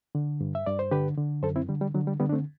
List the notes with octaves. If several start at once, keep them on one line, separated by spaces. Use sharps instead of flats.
D3
G2
E5
G2 D5
C5
D3 G4 B4
D3
F#2 A4 C5
C4 E4
D3 G3
G3
D3 F#3
G3
D3 G3 B3
D4
A3 C4